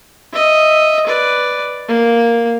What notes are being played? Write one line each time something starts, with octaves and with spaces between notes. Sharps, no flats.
D#5 E5
B4 D5
A#3